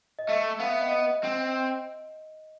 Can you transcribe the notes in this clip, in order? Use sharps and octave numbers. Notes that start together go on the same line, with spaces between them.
D#5
A3 E5
B3 F5
E5
D#5
D#5
C4